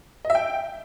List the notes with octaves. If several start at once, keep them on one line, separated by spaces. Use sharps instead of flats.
D#5
E5
G5